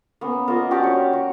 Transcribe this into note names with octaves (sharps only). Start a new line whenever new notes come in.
A#3 B3 C#4
A#3 F4 D#5
C#4 D4 F#4 G4
C#5
F#4